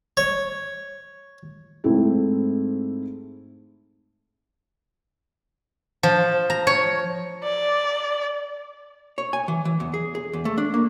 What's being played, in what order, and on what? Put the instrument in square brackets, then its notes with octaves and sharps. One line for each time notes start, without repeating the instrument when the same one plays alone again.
[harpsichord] C#5
[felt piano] G#2 A3 C4 E4
[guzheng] F3
A#5
C#5
[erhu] D5
[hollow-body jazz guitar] C#5
G#5
E3
E3
E2
G#4
G#4
E2
A3
D4
A#3